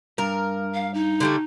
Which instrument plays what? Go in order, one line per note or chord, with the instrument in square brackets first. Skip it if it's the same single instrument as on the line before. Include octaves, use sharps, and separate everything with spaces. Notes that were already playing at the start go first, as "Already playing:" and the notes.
[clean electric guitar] G2 [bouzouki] A#4
[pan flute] F5
D#4
[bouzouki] D3 G3 A3